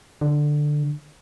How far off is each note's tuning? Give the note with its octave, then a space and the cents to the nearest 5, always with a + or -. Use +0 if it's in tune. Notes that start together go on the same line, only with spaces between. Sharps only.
D3 +10